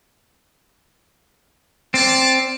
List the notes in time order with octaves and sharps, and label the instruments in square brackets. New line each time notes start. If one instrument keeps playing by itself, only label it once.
[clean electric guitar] C4 [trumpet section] F4 D5 A5